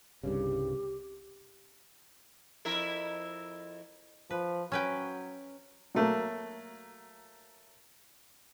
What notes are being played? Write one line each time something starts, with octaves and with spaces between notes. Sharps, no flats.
C2 G2 C#3 G4
F2 E4 A#4
F3 B4
F#3 C#4 B4 G5
F#3 A3 A#3